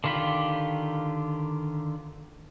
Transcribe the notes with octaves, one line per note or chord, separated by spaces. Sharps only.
D3 D#3 F4 G4 B5